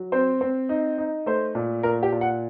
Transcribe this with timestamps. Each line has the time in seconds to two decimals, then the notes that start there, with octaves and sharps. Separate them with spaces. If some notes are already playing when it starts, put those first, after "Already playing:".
Already playing: F#3
0.12 C4 C5
0.41 C4
0.69 D#4
0.98 D#4
1.26 A3 C5
1.55 A#2
1.83 A#2 A#4
2.03 G4
2.12 A#2
2.21 F#5